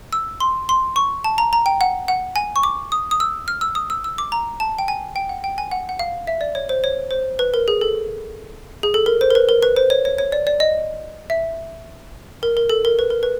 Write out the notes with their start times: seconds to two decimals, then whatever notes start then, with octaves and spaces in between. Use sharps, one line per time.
0.13 E6
0.40 C6
0.69 C6
0.96 C#6
1.24 A5
1.38 A#5
1.53 A#5
1.66 G5
1.81 F#5
2.08 F#5
2.36 G#5
2.56 C#6
2.63 D6
2.92 D#6
3.11 D#6
3.20 E6
3.48 F6
3.61 E6
3.75 D#6
3.90 E6
4.04 E6
4.18 D6
4.32 A#5
4.60 A5
4.79 G5
4.88 G#5
5.16 G5
5.29 F#5
5.44 G5
5.58 G#5
5.71 F#5
5.89 F#5
5.99 F5
6.27 E5
6.41 D5
6.55 C#5
6.69 C5
6.84 C#5
7.11 C5
7.39 B4
7.54 A#4
7.68 G#4
7.81 A4
8.83 G#4
8.94 A4
9.06 A#4
9.21 C5
9.31 A#4
9.35 B4
9.49 A#4
9.62 B4
9.76 C5
9.90 C#5
10.05 C#5
10.18 C#5
10.32 D5
10.47 D5
10.60 D#5
11.30 E5
12.43 A#4
12.57 A#4
12.70 A4
12.85 A#4
12.99 B4
13.10 A#4
13.23 B4